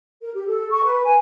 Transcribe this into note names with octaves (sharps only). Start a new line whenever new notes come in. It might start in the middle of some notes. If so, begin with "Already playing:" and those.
A#4
G4
A4
C#6
B4
G#5